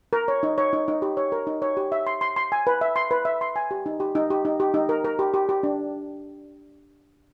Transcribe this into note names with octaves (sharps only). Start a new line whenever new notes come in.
A#4
C#5
D#4
C#5
D#4
D#4
G4
C#5
A#4
D#4
C#5
G4
E5
C6
C6
C6
G#5
B4
E5
C6
B4
E5
C6
G#5
G4
D#4
G4
D#4
G4
D#4
G4
D#4
A#4
A#4
G4
G4
G4
D4